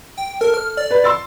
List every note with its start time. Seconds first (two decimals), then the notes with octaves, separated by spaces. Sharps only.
0.17 G5
0.41 A4 A#4
0.54 F6
0.77 D5
0.91 B4
1.04 C6 E6 A6